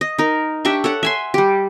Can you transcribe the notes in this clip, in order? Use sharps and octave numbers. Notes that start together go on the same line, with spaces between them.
D#5
D#4 A#4
D4 G4 E5 C#6
A4 C#5 F#5
E5 G#5 C6
G3 G4